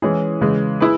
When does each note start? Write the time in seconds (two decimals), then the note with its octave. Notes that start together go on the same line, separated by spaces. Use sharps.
0.02 E3 G#3 C#4 E4 G#4
0.41 C#3 E3 G#3
0.80 E4 G#4 B4